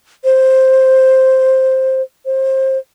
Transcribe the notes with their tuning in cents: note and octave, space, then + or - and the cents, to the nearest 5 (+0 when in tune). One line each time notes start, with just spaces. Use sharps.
C5 +5
C5 +25